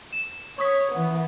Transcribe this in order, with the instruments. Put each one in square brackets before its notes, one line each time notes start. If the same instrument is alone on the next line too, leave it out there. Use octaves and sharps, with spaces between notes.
[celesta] E7
[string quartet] C#5 [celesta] C#6 D#6 B6
[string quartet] E3 B3